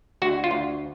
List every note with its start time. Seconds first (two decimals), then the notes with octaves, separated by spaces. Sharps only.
0.22 D2 F#4
0.44 F4
0.51 D2